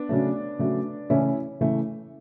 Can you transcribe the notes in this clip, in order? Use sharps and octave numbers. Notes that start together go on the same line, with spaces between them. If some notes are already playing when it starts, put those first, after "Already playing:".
Already playing: B3 D4
C#3 F#3 A3
C#3 F#3 A3
C#3 E3 A3 C#4 E4
C#3 E3 A3